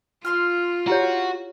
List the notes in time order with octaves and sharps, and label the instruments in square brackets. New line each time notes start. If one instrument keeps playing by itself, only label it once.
[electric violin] F4 [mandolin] F5 C6 F6
[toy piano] E4 G4 C#5 [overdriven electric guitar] F#4